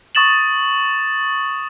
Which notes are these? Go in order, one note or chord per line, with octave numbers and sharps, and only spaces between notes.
C#6 D#6 A6 E7 F#7